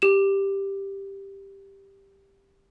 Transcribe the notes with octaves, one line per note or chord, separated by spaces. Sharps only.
G4 E7